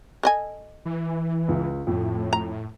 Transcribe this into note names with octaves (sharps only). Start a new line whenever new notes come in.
A4 D#5 G#5
E3
C#2
F2 A2
A#5